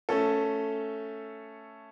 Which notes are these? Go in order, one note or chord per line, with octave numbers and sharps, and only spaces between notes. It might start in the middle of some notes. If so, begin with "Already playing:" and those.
A3 C#4 A4